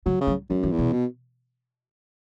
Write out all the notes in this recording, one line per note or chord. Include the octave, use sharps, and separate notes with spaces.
C#3 F#3
C#3
F#3
F#2 F#3
E3
E2
B2
B2